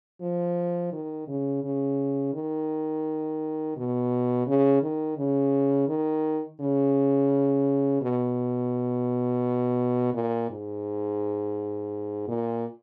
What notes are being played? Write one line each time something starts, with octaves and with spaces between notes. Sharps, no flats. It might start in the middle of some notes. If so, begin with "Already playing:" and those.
F3
D#3
C#3
C#3
D#3
B2
C#3
D#3
C#3
D#3
C#3
B2
A#2
G#2
A#2